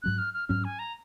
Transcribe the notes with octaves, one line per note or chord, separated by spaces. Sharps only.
G#2 F#3 C#4 F#6
F6
F6
G#2 F#3 C#4 F6
G#5
A#5